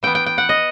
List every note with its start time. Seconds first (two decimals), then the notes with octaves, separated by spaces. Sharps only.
0.03 E3 B3 G5
0.15 G5
0.26 G5
0.38 F#5
0.49 D#5